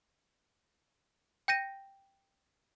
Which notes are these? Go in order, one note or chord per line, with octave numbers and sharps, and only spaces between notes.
G5 G6 A#6 D#7